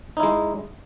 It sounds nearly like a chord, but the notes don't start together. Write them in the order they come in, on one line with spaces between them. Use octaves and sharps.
D#4 E4 G#3